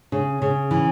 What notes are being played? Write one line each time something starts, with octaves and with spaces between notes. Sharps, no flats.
C#3
C#3
E3